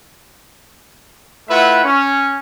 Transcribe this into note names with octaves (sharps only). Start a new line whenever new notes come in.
A3 E4 F4 B4 E5 F#5
C#4